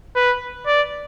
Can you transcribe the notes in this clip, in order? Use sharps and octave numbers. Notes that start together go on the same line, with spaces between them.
B4
D5